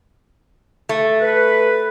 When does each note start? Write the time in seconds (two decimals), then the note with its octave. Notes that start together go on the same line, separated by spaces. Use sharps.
0.89 A3
1.21 B4